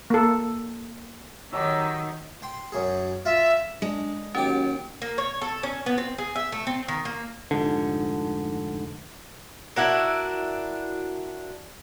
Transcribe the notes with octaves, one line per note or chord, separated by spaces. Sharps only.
A#3 A4
D#3 F#3 D#4 G4 E6
G5 C6
F#2 G#4
F4 E5
G#3 D4
D#2 F#3 C#4 G4 D6
A#3
C#5
A4
C#4
B3
C4
G#4
E5
A3
C4
D#3
A#3
F1 G#2 D3
D4 E4 F#4 A#4